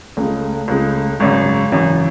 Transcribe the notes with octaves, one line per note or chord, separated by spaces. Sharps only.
C#2 C#3 G#3 A3
C#2 C#3 G#3
G#1 F#2 C#3 G#3
G#3
G#1 F#2 C#3 E3